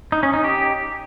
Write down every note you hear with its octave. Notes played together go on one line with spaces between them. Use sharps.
D#4
C#4
D#4
G4